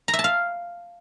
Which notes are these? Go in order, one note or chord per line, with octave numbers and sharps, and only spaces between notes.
A#5
E5
A5
F5